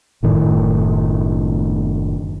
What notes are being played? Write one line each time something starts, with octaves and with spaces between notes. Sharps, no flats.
F#1 A2 D#3